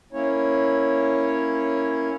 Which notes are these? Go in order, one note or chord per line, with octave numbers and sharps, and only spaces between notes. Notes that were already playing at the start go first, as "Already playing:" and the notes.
A#3 C#4 E4 C#5